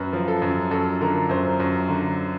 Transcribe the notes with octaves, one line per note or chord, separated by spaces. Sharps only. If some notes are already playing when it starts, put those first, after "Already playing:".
Already playing: F#2 B4
F3
A4
F#2
F#2 A4
D3 A#4
F#2 C5
F#2
D3